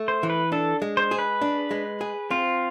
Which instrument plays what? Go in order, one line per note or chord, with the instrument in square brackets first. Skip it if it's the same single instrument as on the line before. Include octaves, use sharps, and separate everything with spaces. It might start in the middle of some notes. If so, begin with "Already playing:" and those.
Already playing: [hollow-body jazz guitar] A3
[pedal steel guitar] C5
[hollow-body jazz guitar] E3
[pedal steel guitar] B4
[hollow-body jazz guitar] D4 [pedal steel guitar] A4
[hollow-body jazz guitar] G#3
[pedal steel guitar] C5
[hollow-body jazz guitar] G#4
[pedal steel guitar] B4
[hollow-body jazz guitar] D4
G#3
G#4
[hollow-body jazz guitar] C4 [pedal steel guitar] F4